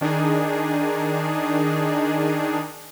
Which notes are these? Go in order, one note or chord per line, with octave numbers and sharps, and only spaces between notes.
D#3 D4 D#4 G#4